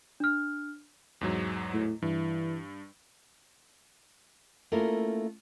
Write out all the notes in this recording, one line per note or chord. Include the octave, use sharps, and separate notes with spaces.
D4 F6
E2 G#2 F#3
A2
G2 E3
A3 A#3 C#4 E4 F4 A#4